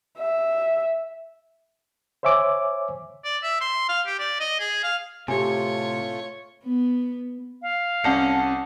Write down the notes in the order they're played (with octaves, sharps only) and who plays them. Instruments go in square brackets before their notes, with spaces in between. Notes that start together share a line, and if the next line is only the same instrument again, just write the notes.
[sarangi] E5
[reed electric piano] C5 C#5 E5 G#5 D6
[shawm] D5
E5
C6
F5
G4
D5
D#5
G#4
F5
[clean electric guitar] A2 C3 [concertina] A3 F4 [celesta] G4 G#5 [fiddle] C#5
[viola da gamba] B3
[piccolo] F5
[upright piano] C2 [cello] C#4 [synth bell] F#5 A5 C#7